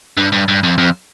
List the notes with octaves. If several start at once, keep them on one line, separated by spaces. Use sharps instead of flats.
G2
G2
G2
F2
F2